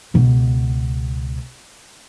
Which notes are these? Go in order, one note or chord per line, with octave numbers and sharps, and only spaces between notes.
C#2 B2